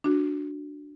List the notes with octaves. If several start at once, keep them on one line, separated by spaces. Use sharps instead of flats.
D4 F#4